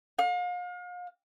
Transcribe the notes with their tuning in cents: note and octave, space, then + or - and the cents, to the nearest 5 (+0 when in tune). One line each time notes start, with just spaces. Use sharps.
F5 +40